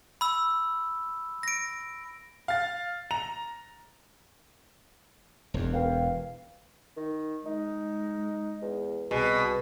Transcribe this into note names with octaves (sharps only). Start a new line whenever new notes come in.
B5 E6
A#6 D7
F5 A6
A#5 F7
E1 E2
A#4 B4 F5 G5
D#3
G#3 D#4
E2
C2 B2 G#4